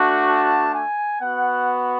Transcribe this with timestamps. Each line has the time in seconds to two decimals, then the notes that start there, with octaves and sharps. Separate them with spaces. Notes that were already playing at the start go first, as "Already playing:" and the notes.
Already playing: A3 D4 F#4
0.28 A5
0.75 G#5
1.21 B3 F#4 F#5